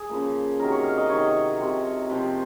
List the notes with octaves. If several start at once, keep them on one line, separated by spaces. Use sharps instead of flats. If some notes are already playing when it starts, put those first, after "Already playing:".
Already playing: G#4
C#3 F3 A#3
C3 D#3 F#3 A#4
C#5
F5
D#5
C3 D#3 F#3 C#5
C3 F3 C4
C3 F3 C4